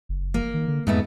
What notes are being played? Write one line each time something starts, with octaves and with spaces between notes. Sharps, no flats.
F#1
A#3
D#3
D3
F2 G#2 A3 B3